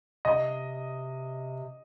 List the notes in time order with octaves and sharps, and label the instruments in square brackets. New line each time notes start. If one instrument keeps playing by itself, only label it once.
[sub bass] C3 [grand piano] D#5